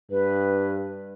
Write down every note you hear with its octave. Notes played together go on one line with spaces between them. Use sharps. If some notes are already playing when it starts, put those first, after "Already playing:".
G2 B4